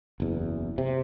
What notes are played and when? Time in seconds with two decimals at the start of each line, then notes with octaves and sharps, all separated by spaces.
0.20 F#1 E2
0.78 C3